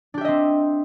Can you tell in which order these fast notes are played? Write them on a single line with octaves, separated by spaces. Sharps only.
D4 G4 E5 D#5 C4